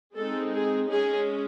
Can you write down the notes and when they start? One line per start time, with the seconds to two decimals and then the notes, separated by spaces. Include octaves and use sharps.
0.15 G#3 C4 D#4 A4
0.52 G#4
0.88 G#3 C#4 G#4